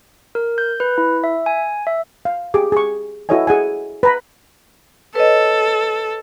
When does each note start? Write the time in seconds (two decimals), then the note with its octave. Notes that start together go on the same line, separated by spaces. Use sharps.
0.35 A#4
0.58 G6
0.80 B4
0.98 E4
1.24 E5
1.46 G#5
1.87 E5
2.25 F5
2.54 G4 G#4 D6
2.72 G#4 C#6
3.29 E4 F#4 A4 C#5 D#5 G#5
3.47 G#4 F#5 G#5
4.03 B4 A#5 B5
5.15 A4 B4 C#5 D#5